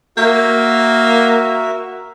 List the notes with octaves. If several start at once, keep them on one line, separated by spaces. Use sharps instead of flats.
A#3 F#4 A#4 E5